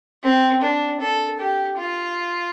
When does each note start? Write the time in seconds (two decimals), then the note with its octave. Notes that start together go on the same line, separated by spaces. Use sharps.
0.23 C4
0.62 D4
1.00 A4
1.39 G4
1.78 F4